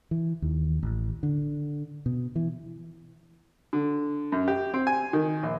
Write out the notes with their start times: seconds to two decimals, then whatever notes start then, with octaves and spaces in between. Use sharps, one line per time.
0.11 E3
0.42 D#2
0.83 A1
1.23 D3
2.06 B2
2.36 E3
3.73 D3
4.32 F#2
4.48 G4
4.74 C4
4.87 G#5
5.13 D#3
5.43 A#1